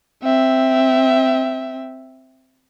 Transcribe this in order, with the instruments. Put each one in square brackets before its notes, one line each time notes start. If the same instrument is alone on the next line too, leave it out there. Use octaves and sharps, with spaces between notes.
[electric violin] C4 E5